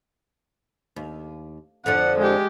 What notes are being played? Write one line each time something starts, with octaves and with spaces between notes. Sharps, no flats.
D#2
F2 D3 F3 F#5
G#3 G4